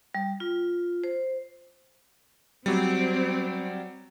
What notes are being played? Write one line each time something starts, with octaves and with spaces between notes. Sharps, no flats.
G3
F4
C5
F#3 G3 C4